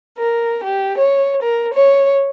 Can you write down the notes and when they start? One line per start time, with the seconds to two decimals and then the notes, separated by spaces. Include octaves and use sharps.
0.17 A#4
0.63 G4
0.97 C#5
1.42 A#4
1.73 C#5